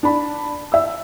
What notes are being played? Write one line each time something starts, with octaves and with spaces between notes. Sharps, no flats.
D4 A5 B5
E5 E6